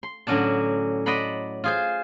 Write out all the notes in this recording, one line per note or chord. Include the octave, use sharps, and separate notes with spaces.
C6
A2 D3 F#3 C#4 D4 A5
D5 D#5 F#5 A5 B5 C6
F4 G#4 C5